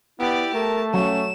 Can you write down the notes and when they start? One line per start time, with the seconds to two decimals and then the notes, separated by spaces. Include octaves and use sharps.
0.20 B3 E4 G4 D5
0.54 A3 A#4 A5
0.94 F#3 C#4 E7